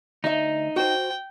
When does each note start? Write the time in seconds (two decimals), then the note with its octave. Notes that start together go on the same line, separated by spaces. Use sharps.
0.24 D2 D#4 D#5 E5
0.76 F#4 C5 G5